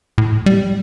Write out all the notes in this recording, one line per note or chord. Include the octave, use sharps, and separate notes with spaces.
A2
G3